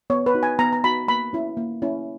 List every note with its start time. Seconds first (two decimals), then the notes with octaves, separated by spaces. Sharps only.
0.10 B3 C#5
0.26 B4
0.34 D#4 F#4
0.43 G#5
0.59 B3 A#5
0.73 A#5
0.84 D#4 F#4 B5
1.08 A#3 B5
1.33 C#4 E4
1.57 A#3
1.82 C#4 E4